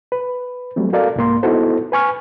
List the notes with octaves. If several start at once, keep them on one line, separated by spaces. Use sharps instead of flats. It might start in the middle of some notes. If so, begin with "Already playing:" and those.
B4
F#3 G3 A3 C4
F#4 A4 A#4 D5 F5
C2 G#2 A#3 C6
B3 D#4 E4 F#4 A4 C5
B4 G#5 C#6 F6